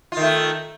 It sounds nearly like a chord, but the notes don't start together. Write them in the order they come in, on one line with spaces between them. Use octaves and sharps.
F4 D#3 A3